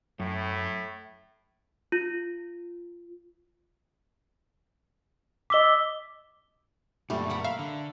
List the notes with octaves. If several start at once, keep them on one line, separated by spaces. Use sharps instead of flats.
F#2 A2
F4
D#5 D6 E6 B6 G7
F#2 A#2 G3 A3
A#4 F#5 B5
E5 F5
D3